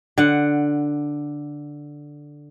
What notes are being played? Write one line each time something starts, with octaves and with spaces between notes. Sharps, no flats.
D3 F#5